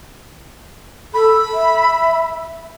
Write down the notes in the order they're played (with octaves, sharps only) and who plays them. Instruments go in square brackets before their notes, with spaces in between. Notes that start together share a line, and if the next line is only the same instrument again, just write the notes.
[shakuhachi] A4 [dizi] B5
[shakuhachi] E5